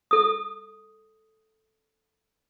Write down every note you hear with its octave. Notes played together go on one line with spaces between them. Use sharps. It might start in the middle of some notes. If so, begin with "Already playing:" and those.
A4 D#6